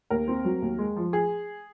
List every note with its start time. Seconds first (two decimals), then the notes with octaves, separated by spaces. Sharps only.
0.10 D#2 A#4
0.28 C4
0.45 F#3
0.62 D#2
0.78 G#3
0.96 F3
1.13 G#4